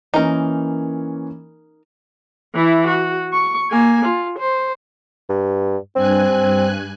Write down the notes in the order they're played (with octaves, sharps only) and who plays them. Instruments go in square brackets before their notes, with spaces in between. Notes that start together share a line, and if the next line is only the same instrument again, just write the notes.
[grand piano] E3 A#3 C#4 [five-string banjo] D#4 A#4
[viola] E3 E4
F#4
C#6
A#3 G#5
F4
C5
[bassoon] G2
[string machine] G2 G#5 F#6 [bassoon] C4